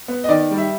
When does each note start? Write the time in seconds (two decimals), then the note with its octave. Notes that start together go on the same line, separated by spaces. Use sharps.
0.08 B3
0.24 D#5
0.29 D#3 D5
0.51 G3
0.58 E5